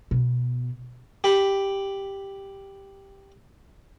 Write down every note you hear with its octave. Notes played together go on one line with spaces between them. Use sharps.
B2
G4 B5